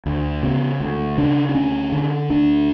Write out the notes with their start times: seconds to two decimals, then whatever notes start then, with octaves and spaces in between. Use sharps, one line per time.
0.06 D2
0.43 C#3 B3
0.80 D2
1.18 C#3 D4
1.49 D4
1.55 D2 C#4
1.92 D3
2.30 D2 D4